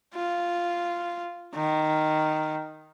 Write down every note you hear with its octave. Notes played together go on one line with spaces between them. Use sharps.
F4
D#3